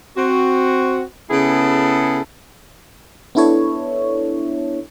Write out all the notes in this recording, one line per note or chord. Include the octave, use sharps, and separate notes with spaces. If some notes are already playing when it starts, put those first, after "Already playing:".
C4 F#4
C#3 B3 E4 G#4 A4
B3 D4 E4 A4 C#5